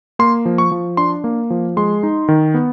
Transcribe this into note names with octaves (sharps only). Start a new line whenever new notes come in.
A#3 C6
F3
C#6
F3
D4 C6
A#3
F3
G#3 C6
D#4
D#3
B3